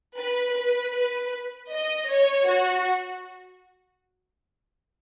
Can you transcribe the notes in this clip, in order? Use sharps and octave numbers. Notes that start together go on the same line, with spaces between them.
B4
B4
B4
D#5
C#5
F#4